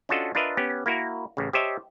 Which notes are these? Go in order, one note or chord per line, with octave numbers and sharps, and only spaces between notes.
C#4 D4 F4 F#4 A4 D#5
D4 F4 A#4 B4 D#5 E5
B3 C#4 G4
A#3 E4 F#4 A#4
A1 C#3
G4 C5 C#5 D#5 E5 A5